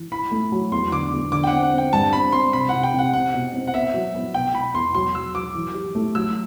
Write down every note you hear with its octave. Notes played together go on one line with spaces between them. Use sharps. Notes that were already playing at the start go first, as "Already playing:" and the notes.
Already playing: E3
E4 B5
A3
F#3
E2 C6
D3 D6
E2
D3 D6
G5
F#5
C4
F#5
C4
G5
G2 A5
C4 B5
C4 C6
C3 B5
C3 F#5
G5
C3
F#5
C4 F#5
B2
C4
F#5
B3 E5
F#3
B3
B2 G5
B2 B5
E2 C6
F#3 C6
F#3 E6
F#3 D6
E3
G4
A3
F#3 E6